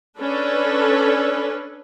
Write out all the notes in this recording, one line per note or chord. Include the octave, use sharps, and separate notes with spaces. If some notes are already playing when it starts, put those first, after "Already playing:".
C#4 D4 A4 B4